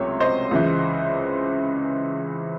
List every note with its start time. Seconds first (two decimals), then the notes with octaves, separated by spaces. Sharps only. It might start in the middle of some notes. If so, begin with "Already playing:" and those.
Already playing: C#2 C3 F#3 A3 C#5 C6
0.20 C5 D#5
0.51 C#2 C#3 E3